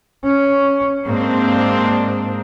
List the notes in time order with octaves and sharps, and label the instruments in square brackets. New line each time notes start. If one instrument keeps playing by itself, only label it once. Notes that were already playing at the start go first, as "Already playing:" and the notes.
[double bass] C#4
[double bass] G#2 [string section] A#3 C4 D4